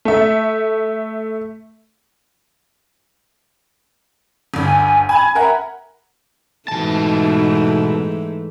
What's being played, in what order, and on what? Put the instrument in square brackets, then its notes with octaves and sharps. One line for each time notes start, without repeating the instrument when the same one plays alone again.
[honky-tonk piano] A3 E5
G1 D2
[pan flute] G#5
[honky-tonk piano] G#5 G#6 [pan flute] B5
[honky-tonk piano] A#4 F#5 B5 [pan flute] E5
[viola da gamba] G#2 E3 A3 [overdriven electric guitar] B2 A5